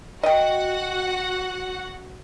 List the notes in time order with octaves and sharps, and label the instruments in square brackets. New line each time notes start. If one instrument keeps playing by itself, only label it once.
[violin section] F#4 F#5 [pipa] D#5 G5